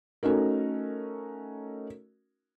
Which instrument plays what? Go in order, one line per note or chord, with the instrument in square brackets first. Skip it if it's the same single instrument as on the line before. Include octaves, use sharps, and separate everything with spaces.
[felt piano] A3 C#4 D#4 F#4 A#4